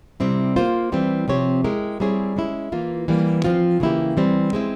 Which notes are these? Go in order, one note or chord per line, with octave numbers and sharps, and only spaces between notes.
C3 G3 C4 E4
A#3 F4 C5
E3 G3 C4
C3 F3 C4 G4 C#5
G#3 E4 G4 A#4
G3 C4 E4 G#4 C#5
G#3 C#4 E4
E3 A#3 F4
E3 G3 A#3
F3 C4 F4
C#3 E3 A#3 E4 G4
E3 G3 C4
G#3 C4 E4